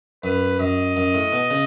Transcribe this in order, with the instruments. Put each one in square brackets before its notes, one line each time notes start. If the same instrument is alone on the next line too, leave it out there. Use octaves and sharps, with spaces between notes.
[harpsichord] F#2 [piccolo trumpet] B4
[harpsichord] F#2 [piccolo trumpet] D#5
[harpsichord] F#2
A2
B2
C#3